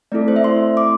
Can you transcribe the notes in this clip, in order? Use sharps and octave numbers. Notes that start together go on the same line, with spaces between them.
A3 C4 E4 A4 D5
C5
E5
C6
D6